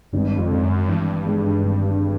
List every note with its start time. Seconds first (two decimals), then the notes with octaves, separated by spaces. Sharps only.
0.13 G#1 G2
0.38 F2
0.51 G#1
0.63 F#2
0.88 G2 E3
1.26 G#2
1.64 G#1